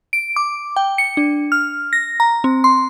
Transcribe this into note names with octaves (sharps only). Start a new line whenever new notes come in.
D7
D6
G5
C#7
D4
F6
A#6
A#5
C4
C6